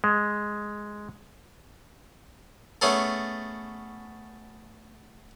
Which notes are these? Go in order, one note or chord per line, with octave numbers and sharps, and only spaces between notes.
G#3
A3 B3 C#4 G#4 A4